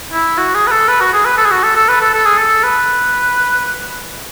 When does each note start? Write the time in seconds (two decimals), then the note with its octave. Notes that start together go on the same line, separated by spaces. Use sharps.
0.13 E4
0.38 F#4
0.55 G#4
0.68 B4
0.72 A4
0.89 B4
1.01 F#4
1.13 G#4
1.26 B4
1.38 A4
1.46 G#4
1.51 F#4
1.64 A4
1.76 A4
1.89 B4
2.01 A4
2.14 A4
2.26 G#4
2.38 A4
2.64 B4